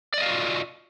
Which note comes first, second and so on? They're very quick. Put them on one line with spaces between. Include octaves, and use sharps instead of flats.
D5 D#5 F5 F#4 F4